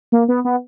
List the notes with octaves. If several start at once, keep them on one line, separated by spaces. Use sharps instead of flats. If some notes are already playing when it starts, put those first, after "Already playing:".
A#3
B3
B3